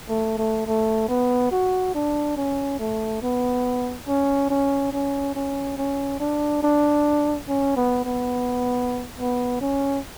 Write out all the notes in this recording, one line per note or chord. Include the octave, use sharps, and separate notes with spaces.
A3
A3
A3
B3
F#4
D4
C#4
A3
B3
C#4
C#4
C#4
C#4
C#4
D4
D4
C#4
B3
B3
B3
C#4